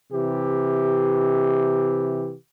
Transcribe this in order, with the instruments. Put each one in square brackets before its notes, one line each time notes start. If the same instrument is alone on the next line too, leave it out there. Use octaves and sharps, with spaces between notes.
[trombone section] C3 E3 G4